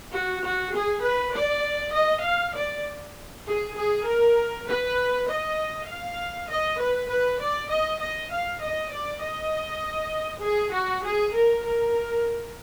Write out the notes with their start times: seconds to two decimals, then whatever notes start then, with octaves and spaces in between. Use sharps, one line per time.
0.13 F#4
0.43 F#4
0.73 G#4
1.04 B4
1.34 D5
1.94 D#5
2.25 F5
2.55 D5
3.46 G#4
3.77 G#4
4.06 A#4
4.67 B4
5.28 D#5
5.89 F5
6.49 D#5
6.80 B4
7.10 B4
7.41 D5
7.70 D#5
8.01 D#5
8.32 F5
8.61 D#5
8.93 D5
9.22 D#5
10.43 G#4
10.74 F#4
11.05 G#4
11.34 A#4
11.66 A#4